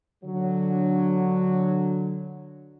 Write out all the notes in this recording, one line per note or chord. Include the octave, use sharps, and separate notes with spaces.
D3 F#3